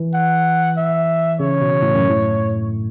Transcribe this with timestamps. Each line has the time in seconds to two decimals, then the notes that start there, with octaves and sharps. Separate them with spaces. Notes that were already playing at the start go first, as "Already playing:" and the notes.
Already playing: E3
0.14 F#5
0.77 E5
1.40 C#3 C#5
1.61 B2
1.82 A2
1.95 F#2
2.09 A2